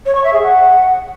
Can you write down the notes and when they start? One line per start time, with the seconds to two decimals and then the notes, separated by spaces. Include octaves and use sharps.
0.06 C#5
0.15 C#6
0.24 E5
0.33 G#4
0.42 F#5